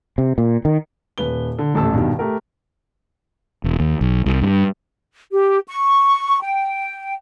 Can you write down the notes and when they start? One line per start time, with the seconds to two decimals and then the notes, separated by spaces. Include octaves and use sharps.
0.18 C3
0.38 A#2
0.65 D#3
1.18 D#1 B4 G7
1.58 D3
1.74 D#1 A1 A3 A5 E6
1.93 G2 B2 D#3
2.19 A3 G4 A#4
3.64 E1
3.80 D#2
4.01 B1
4.26 C2
4.42 G2
5.32 G4
5.67 C#6
6.41 G5